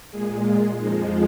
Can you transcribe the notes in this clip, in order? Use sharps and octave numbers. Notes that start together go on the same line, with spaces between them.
A#2 G#3 G#4
F4
F2 F3 G#3 D#4